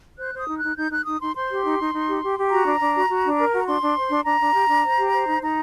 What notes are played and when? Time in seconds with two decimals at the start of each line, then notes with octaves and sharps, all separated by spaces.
0.19 C5 F#6
0.34 C5 D#6
0.49 D#4
0.57 F#6
0.63 D#4
0.77 D#4 G6
0.92 D#4 F#6
1.06 D#4 D#6
1.20 D#4 C6
1.35 C5 C6
1.49 G4
1.64 D#4
1.79 D#4
1.93 D#4
2.08 G4
2.22 G4
2.37 G4
2.51 F#4 A#5
2.65 D4
2.80 D4
2.95 F#4
3.09 F#4
3.24 D4
3.38 A#4
3.53 F#4
3.59 A#5
3.67 D4 C6
3.81 D4
3.96 C5
4.10 D4
4.25 D4 A#5
4.40 D4
4.54 G4
4.69 D4
4.83 C5
4.98 G4
5.12 C5
5.26 D#4
5.41 D#4 A#5